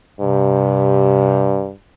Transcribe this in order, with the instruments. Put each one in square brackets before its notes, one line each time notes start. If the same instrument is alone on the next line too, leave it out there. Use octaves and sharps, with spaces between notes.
[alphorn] G2 [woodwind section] C3